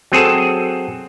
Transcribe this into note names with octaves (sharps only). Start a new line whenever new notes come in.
F#3 C4 G#4 A4